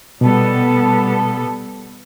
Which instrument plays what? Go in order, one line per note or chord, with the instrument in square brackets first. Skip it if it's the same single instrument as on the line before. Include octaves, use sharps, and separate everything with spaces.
[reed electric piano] B2 [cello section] G3 B3 A4